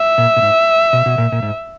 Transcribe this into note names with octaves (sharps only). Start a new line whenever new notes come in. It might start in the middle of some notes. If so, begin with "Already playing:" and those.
Already playing: E5
A#2
A#2
G#2
B2
B2
A#2
A#2
G#2